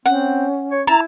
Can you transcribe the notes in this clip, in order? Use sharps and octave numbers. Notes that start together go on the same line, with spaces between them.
C4 C#4 F#5
C#5
E4 A5 A#5